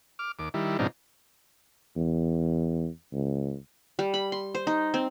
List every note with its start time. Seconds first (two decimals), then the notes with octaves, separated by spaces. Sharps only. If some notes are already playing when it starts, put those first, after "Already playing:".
0.19 D6 F6
0.39 D#2 D6
0.54 D#3 G3 E4
0.79 G#2 B2 F3 C4 D4 D#4
1.96 E2
3.12 C#2
3.99 G3
4.14 B5
4.32 C6
4.55 C5
4.67 D#4
4.94 C4